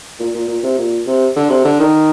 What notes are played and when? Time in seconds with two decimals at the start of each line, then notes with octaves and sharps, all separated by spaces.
0.19 A#2
0.35 A#2
0.48 A#2
0.63 C3
0.78 A#2
1.07 C3
1.36 D3
1.50 C3
1.65 D3
1.80 D#3